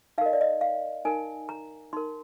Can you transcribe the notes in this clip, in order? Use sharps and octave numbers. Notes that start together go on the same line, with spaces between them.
D#4 A#4 D#5 F5
D5
D#5
F5
D#4 A#4 G#5
A#5
D#4 A#4 C6